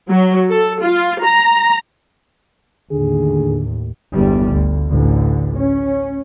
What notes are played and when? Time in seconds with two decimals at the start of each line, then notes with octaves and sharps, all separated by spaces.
0.10 F#3
0.48 A4
0.83 F4
1.24 A#5
2.91 D#2 A2 D3 G#4
4.13 G1 E2 G3
4.52 D2
4.88 A1 D2 D3
5.57 C#4